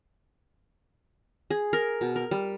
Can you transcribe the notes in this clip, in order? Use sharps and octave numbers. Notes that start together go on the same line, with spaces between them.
G#4
A#4
B2
A#4
G3